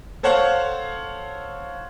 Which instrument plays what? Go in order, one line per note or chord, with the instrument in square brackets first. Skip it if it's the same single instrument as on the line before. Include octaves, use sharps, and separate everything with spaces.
[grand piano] A4 C5 C#5 F5 F#5 F6